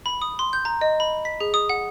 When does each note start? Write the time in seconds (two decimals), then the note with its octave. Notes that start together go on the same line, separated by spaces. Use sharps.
0.06 B5
0.22 D#6
0.39 C6
0.53 G6
0.65 A#5
0.81 D#5
1.00 B5
1.25 B6
1.40 G#4
1.54 D#6
1.70 F#5